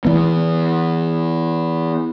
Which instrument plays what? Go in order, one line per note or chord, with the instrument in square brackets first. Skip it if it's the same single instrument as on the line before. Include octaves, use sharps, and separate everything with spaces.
[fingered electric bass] E3 B3